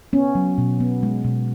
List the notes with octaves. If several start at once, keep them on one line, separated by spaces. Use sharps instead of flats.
B3 C#4
F#3
B2
B3
G#3
B2